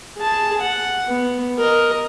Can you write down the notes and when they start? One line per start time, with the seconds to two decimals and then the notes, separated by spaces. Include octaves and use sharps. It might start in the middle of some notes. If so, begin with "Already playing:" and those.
0.17 G#4 A5
0.61 F#5
1.08 B3
1.58 A#4 D#5